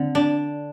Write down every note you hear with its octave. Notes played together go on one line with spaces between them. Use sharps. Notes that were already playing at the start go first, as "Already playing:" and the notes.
Already playing: D3 C4
D4